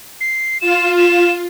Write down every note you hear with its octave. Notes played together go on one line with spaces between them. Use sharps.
C7
F4 E7
E7